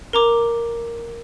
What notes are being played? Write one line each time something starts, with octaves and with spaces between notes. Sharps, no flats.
A#4 A#5 D6